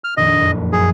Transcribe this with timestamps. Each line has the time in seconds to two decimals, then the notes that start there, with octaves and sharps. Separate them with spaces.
0.04 F6
0.17 A#1 F2 D#3 D#5
0.39 F#1 F2
0.73 F#2 G#4